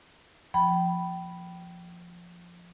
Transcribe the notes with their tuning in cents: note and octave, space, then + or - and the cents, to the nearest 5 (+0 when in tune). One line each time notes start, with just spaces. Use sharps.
F3 +0 G5 -25 B5 +0